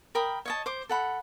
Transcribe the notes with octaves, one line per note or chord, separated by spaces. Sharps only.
A#4 G5 B5 D#6
C#5 D#5 A5
C5 D6
A4 F#5 B5